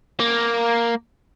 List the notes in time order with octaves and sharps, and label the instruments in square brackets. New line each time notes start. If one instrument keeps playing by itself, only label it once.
[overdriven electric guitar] A#3